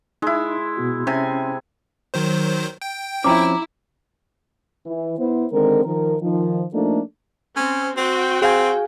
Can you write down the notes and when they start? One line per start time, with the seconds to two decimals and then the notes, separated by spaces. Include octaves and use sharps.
0.22 G#3 D#4 E4
0.77 B2 B3 F#4
1.07 C3 C#4 G#5
2.14 D#3 F#3 C5
2.82 G5
3.24 F3 C4 C#4 E4 A#5 D6
4.86 E3
5.19 B3 E4 C5
5.52 D3 D#3 G#3 C4 A#4
5.85 D#3 F3 A#4
6.22 D#3 F3
6.74 F3 A3 A#3 D4 D#4 A4
7.56 C4 C#4
7.97 C4 F#4 G5
8.42 C4 G#4 F5 G#5